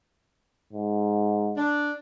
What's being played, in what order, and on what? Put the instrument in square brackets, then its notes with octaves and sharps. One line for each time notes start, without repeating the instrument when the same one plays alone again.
[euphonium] G#2
[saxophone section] D4